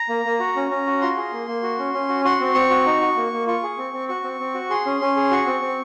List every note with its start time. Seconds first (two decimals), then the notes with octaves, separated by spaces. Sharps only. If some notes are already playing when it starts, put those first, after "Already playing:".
Already playing: A#5
0.09 A#3
0.25 A#3
0.40 F#4
0.56 C#4
0.71 C#4
0.86 F#4
1.01 F4 C6
1.17 G#4
1.32 A#3
1.48 A#3
1.63 F#4
1.79 C#4
1.94 C#4
2.09 F#4
2.24 F#4 C6
2.40 C4
2.55 C4 C#6
2.70 F#4
2.86 D#4
3.01 F#4
3.17 A#3
3.32 A#3
3.47 F4 C#6
3.63 G#4
3.78 C4
3.94 C4
4.08 F#4 C#6
4.24 C4
4.40 C4
4.54 F#4
4.70 G#4 C6
4.86 C#4
5.01 C#4
5.16 G#4
5.31 F#4 C#6
5.46 C4
5.62 C4